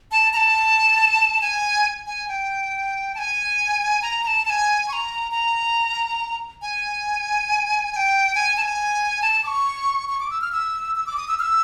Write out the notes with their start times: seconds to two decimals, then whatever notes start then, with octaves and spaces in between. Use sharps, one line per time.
0.12 A5
0.33 A#5
0.37 A5
1.41 G#5
2.07 G#5
2.28 G5
3.15 A5
3.19 G#5
4.02 A#5
4.23 A#5
4.27 A5
4.45 A5
4.50 G#5
4.88 C#6
4.93 A#5
5.32 A#5
6.62 G#5
7.92 G#5
7.96 G5
8.35 G#5
8.57 A5
8.62 G#5
9.22 A5
9.44 D6
9.47 C#6
10.09 C#6
10.20 D6
10.30 E6
10.41 F6
10.52 E6
10.96 E6
11.06 D6
11.17 D#6
11.28 E6
11.39 F6
11.42 E6